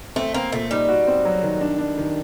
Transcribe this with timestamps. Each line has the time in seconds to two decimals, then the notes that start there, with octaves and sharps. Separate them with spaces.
0.16 A3 C4
0.34 A#3 C4
0.52 A#2 A3
0.71 G3 D#4
0.89 F#4
1.07 C4
1.25 F#3
1.43 D#3
1.61 D4
1.79 D4
1.98 D#3